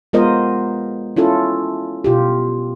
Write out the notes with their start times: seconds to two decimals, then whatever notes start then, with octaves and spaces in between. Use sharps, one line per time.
0.13 G#3 B3 F4 A#4 C5 D#5
1.16 C#4 E4 F4 A4
2.04 B2 F4 G4